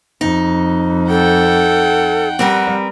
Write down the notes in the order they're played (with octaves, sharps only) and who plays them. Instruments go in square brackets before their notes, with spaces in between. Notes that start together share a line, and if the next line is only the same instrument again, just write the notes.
[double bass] F2 [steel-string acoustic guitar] D#4
[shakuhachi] A4 [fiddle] F#5 G5
[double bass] G3 [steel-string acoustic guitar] C4 A#4 B4 [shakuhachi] F#5